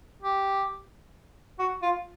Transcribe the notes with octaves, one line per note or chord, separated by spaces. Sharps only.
G4
F#4
F4